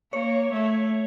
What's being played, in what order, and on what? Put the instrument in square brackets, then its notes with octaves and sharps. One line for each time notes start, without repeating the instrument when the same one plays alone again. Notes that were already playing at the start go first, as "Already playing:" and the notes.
[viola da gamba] A#3 [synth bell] C#5
[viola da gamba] A3